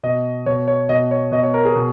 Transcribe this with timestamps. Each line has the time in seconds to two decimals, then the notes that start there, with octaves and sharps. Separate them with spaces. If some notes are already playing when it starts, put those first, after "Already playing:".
0.03 B2 D#5
0.46 B2 C#5
0.68 C#5
0.89 B2 D#5
1.11 C#5
1.32 B2 D#5
1.43 C#5
1.54 A#4
1.65 G#4
1.75 B2